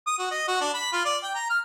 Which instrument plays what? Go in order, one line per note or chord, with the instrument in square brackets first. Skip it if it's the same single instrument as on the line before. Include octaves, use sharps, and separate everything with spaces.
[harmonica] D#6
F#4
D#5
F#4
D4
B5
F4
D5
G5
A#5
F6